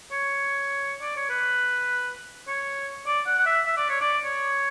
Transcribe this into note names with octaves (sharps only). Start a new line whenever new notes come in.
C#5
D5
C#5
B4
C#5
D5
F#5
F#5
E5
E5
D5
C#5
D5
C#5